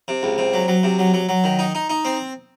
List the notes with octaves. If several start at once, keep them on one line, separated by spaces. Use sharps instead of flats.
C3
C#2
C3
F#3
F#3
C3
F#3
F#3
F#3
D#3
D#4
D#4
D#4
C4